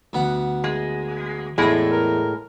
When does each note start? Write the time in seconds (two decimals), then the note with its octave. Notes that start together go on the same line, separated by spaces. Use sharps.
0.13 D2 B3 F#5
0.64 G#3
1.58 E2 A2 G#3 E5
1.92 A#4